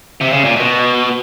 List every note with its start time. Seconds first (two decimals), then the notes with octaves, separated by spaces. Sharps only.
0.21 C3
0.33 C#3
0.45 A#2
0.56 B2